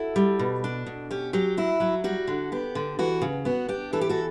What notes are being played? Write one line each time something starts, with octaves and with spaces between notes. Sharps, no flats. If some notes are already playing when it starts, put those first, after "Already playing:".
Already playing: E4 F#4 A4
G3
B2
D4
B2
C#4 G4
F#3 G4
E4 F#4
F#3 F#4
G3 F#4
D3
B3 G4
D3
E3 F#4
C#3
B3 F#4
D4 G4
E3 A4
G4
F#4 A4